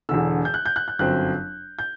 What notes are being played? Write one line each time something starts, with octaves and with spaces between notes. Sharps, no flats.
E1 E2 D3 E6
G6
F#6
G6
F#6
F#6
G1 F#2 F#3 C4 F#6
G6